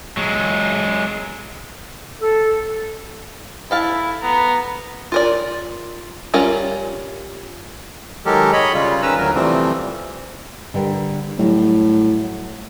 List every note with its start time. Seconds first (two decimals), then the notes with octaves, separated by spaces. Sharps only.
0.17 F#3 G#3
2.21 A4
3.71 E4 A4 F5 A5
4.23 B3 A#5
5.12 F4 A#4 D5
6.34 G3 C#4 F4 A#4
8.26 D#3 F#3 G#3 G4 A4 A#4
8.53 C#5 D#5 B5
8.73 C#3 G3 F4
9.02 D#3 C#4 B4 A#5 E6
9.18 D2 F#3 A#4
9.35 C3 E3 F3 G3 A3 C4
10.74 D3 G3 A#4
11.38 A2 F#3 G3 F#4